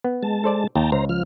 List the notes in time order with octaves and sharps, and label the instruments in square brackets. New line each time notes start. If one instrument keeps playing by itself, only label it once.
[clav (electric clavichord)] B3
[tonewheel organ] G#3 A5
[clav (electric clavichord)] A4 C5 D5
[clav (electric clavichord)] D#2 [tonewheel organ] G5 A5 A#5
[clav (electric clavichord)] C#2 [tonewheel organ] C5 A#5
[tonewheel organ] F3 F6